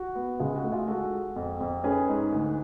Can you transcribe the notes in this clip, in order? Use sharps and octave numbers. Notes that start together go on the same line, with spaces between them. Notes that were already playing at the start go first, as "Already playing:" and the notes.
Already playing: F#4
B3
C#2 F4 G#4
F#4
A3
F4 G#4
G#3 F#4 A4
G#3
F2
F2
C#4 G#4 B4
G#2
D2